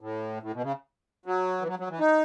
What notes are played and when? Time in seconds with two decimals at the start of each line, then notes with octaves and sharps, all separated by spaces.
0.01 A2
0.43 A2
0.53 B2
0.63 C#3
1.26 F#3
1.61 E3
1.68 F#3
1.79 F#3
1.90 E3
1.99 D#4